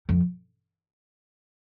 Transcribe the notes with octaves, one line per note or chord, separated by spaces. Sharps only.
F2